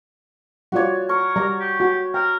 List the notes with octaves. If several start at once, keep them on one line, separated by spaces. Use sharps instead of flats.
G3 F4 F#4 C#5 D5
A#4 C#6
G3 D5 A#5
G4
F#4
A#4 G5